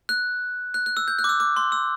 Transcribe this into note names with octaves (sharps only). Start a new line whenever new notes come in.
F#6
F#6
F#6
E6
G6
F#6
D6
E6
D6
C6
E6